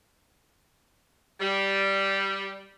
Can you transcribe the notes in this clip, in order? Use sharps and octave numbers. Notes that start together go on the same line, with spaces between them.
G3